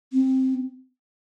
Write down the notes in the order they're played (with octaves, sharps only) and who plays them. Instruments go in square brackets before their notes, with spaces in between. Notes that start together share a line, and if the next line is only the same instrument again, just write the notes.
[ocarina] C4